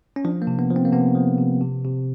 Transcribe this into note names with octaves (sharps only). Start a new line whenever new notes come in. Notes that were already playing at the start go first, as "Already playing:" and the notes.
C#4
F3 D4
A#3
C3
B3
F3
C4
A#3
C3 B3
F3
C3
C3
C3